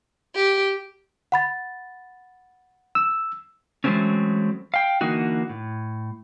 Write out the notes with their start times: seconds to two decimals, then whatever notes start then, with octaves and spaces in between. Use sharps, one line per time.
0.35 G4
1.32 F#5 B5 A6
2.95 E6
3.84 E3 F#3 G#3 A3 C4 C#4
4.74 F5 G5
5.01 D3 E3 A#3 D#4 F#4
5.49 A2